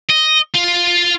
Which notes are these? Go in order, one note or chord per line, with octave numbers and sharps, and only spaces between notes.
D#5
F4